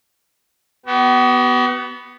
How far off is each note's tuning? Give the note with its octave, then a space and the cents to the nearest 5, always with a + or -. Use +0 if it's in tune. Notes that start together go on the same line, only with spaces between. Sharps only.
B3 +0 F#4 +45